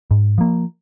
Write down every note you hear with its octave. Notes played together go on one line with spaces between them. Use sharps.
G#2
F3 A#3